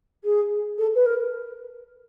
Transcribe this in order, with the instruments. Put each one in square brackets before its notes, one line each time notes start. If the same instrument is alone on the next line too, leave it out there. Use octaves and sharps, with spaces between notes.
[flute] G#4
A4
B4
A#4